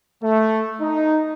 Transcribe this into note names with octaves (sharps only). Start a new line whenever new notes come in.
A3
D#4